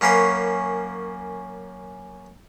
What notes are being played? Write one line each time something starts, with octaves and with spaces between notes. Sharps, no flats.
F#2 A#3 C#4 B4 C6